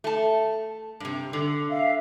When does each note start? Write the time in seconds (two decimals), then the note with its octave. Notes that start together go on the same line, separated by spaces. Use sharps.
0.04 A3 A5
1.00 G2 C3
1.33 D3
1.70 E5 F5